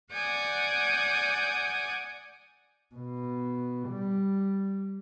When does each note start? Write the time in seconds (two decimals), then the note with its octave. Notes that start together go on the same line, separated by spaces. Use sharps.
0.12 D5 F#5 G#5 D#6 G6
2.95 B2
3.89 G3